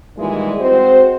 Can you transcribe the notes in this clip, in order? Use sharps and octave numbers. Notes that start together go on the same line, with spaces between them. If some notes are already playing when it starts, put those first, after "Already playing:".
A#2 D#3 E3 G3 G#3
G#3 C4 F#4 C5